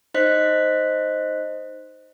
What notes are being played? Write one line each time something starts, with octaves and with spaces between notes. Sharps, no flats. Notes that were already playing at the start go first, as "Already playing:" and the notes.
D#4 C5 D#5 F#6 B6